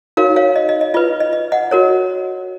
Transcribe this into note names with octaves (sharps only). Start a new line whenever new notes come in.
D#4 F#4 A#4 C#5 F5
C#5 F5
D#5
D#5
D#5
F4 B4 D#5
D#5
D#5
D#5 F#5
F#4 A#4 C#5